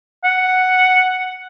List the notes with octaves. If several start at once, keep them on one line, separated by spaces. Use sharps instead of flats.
F#5